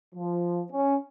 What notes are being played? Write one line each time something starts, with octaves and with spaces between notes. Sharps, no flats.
F3
C#4